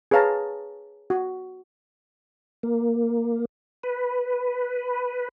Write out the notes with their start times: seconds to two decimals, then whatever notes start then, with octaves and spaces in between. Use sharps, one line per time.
0.11 G#4 B4 C#5 F5 A5 A#5
1.10 F#4
2.63 A#3
3.83 B4